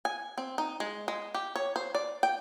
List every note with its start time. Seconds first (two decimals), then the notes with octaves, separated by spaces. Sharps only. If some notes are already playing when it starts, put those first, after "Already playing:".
0.05 G#5
0.38 C4
0.58 D#4
0.80 G#3
1.08 G#3
1.34 G4
1.56 C#5
1.76 C5
1.95 D5
2.23 G5